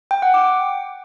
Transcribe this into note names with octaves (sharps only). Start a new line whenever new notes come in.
G5
F#5
D6